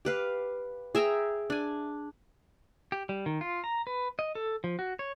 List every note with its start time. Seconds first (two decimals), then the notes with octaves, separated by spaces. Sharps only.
0.05 G4 B4 F5
0.95 G#4 E5 G5 A#5
1.50 D4 G#5
2.92 G4
3.09 G3
3.26 D#3
3.41 F4
3.64 A#5
3.87 B4
4.19 D#5
4.35 A4
4.64 F3
4.79 F#4
4.99 C#5